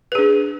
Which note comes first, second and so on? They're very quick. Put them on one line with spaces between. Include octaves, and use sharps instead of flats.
B4 G#4 D4